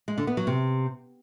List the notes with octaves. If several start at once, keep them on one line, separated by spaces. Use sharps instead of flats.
G#3
D3
B3
F#3
C3